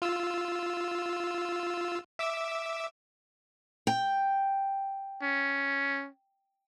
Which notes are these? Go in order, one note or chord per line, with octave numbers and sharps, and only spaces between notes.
F4 E6
E5 D6 E6
G5
C#4